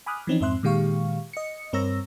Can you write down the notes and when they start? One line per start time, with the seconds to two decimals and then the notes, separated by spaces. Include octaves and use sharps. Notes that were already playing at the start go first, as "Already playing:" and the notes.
0.06 G#5 B5 D6 D#6 F6 F#6
0.27 E3 F3 C4 C#4 D#4
0.40 F2 G#2 C4 E5 C6 F#6
0.63 A#2 D#3 G#3 G4 F5 C#6
1.33 D#5 C#7
1.73 G2 C4 A#4 C#5 E6 A#6